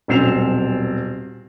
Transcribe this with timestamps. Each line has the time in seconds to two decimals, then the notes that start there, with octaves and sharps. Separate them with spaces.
0.08 D#1 B1 C4 C7 E7 F7